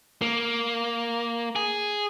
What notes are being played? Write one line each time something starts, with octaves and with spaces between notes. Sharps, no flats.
A#3
G#4